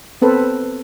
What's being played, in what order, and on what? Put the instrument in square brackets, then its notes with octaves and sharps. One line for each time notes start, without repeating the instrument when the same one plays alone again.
[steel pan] B3 C4 A4 B4 C5